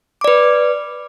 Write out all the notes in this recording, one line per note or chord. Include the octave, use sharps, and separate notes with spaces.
B4 D5 D6